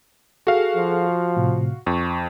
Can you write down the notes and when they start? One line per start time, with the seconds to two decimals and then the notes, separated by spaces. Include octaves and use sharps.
0.47 F#4 G#4 A4 F5
0.76 F3
1.37 A2 C3
1.87 F2 C#6